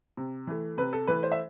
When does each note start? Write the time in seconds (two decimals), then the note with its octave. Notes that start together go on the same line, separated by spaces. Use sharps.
0.17 C3
0.47 E3 A3
0.78 C3 B4
0.93 A4
1.07 E3 A3 B4
1.23 C5
1.32 E5